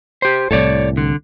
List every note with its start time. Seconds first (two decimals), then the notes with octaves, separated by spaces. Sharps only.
0.22 G4 C5
0.51 C2 A2 A4 C#5 D5
0.97 D3